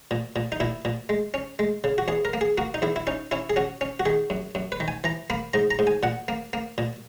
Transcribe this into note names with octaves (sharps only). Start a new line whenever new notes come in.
A#2
A#2
D#4
A#2 E4
A#2
G#3
C#4
G#3
C#3
F#4
E2 G#4
A#4
A#3
G#4
A#3 F#4
D#4
E2 E4
E4
C#4 D#4
C#4 E4
G#4
C#4 F#4
C#4
F#4
D#3 G#4
F#2
F#2
B4
D#3
G#5
E3 A#5
A#3 B5
G#2 A#5
A#5
G#2
G#5
A#2 F#5
A#3
A#3
A#2